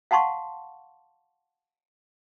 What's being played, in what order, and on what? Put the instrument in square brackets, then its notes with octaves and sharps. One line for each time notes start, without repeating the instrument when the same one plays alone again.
[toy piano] F5 F#5 A5 C6 C#6